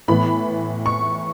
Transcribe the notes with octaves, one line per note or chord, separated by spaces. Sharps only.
A2 E3 B3 B5
C#6